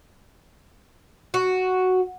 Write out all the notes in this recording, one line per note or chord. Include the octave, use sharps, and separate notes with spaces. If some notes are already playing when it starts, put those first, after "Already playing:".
F#4